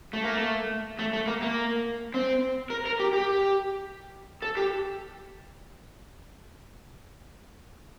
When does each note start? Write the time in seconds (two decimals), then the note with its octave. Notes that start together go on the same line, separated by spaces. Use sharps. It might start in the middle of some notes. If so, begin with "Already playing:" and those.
0.13 A3
0.24 A#3
0.33 A3
0.99 A3
1.13 A3
1.27 A#3
1.42 A#3
2.14 C4
2.70 A#4
2.86 A#4
3.00 G4
3.13 G4
4.42 A4
4.57 G4